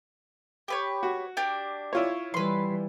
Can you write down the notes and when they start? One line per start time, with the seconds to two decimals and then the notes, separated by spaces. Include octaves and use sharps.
0.68 G4 B4 C#5
1.03 F#4
1.37 D4 G4 A5
1.93 E4 F4 C#5
2.34 E3 G3 B4 C6